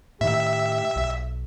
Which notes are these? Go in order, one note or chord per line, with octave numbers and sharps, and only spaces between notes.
A2 D#3 G4 E5
B1